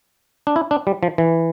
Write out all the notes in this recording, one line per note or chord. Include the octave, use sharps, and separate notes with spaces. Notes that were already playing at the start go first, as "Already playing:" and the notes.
D4
E4
D4
G3
F3
E3